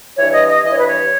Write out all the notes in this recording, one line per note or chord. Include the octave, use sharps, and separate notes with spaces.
G2 E3 C#5
D#5
D#5
G2 E3 C#5 D#5
B4
C#5